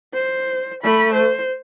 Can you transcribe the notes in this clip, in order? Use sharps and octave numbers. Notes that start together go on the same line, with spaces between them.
C5
A3 B5
C5